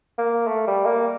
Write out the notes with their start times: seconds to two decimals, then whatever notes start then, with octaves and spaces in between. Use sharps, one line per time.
0.18 A#3
0.47 A3
0.67 G3
0.86 A#3